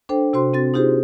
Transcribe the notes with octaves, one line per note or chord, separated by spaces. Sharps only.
D4 A4 C5 G5
C3 F#4 C5 C6
C4 F#4 A6
D#4 F4 G4 G#4 C5